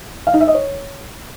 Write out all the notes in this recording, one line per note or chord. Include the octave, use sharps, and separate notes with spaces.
F5
D#4
E5
D#5
C#5